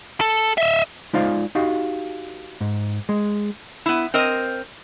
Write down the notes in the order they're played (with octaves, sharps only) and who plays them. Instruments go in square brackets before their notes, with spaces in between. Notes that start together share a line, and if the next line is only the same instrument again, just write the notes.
[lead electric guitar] A4
D#5 E5
[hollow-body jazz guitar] G#3 D#4 F4 C5 D5 F5
D#4 F#4 G4 F5
G#2
G#3
[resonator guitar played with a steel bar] B3 E4
C4 A#4 C5 D#5